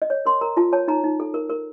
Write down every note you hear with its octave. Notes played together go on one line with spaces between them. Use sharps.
D#5
C#5
A#4 C6
A#4 A#5
F4 A5
C#5 A5
D#4 A#5
D#4
A4
A#4
A#4